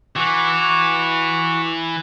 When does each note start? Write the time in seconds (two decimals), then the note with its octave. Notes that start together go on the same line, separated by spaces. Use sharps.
0.16 E3 F#4 C#6 D6